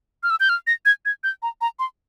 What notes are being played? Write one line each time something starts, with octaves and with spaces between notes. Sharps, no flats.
F6
E6
G6
F6
A#6
G#6
G#6
G6
A#5
A#5
C6